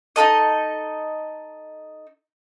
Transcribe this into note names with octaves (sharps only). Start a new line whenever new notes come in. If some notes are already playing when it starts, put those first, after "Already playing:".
D#4 E4 A4 D#5